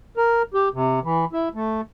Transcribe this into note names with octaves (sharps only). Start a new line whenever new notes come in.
A#4
G4
C3
E3
E4
A3